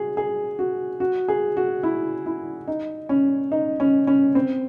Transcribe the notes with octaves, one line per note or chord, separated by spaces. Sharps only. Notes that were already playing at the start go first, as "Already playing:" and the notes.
Already playing: F#4 G#4
G#4
F#4
F#4
G#4
F#4
E4
E4
D#4
C#4
D#4
C#4
C#4
C4